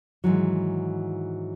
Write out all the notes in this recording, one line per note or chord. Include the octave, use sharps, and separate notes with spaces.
G#2 D#3 E3 F#3